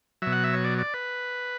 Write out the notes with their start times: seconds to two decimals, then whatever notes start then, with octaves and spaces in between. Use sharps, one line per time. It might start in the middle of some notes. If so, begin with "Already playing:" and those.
0.22 B2 F#3 E5
0.32 F#5
0.44 E5
0.53 C#5
0.64 D5
0.78 D5
0.94 B4